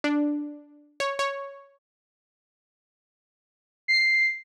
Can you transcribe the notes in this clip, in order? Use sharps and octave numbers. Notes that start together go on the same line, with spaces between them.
D4
C#5
C#5
C7